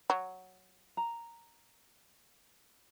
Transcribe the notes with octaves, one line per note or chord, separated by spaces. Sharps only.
F#3
A#5